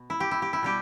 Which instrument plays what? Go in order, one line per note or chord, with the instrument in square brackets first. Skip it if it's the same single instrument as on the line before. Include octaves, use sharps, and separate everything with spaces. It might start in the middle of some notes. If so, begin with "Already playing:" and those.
Already playing: [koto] B2
E4
G4
E4
G4
E4
B2 G3 G4